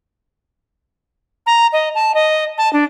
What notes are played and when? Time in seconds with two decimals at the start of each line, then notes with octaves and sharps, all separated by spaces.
1.46 A#5
1.73 D#5
1.95 A5
2.15 D#5
2.58 A5
2.73 D4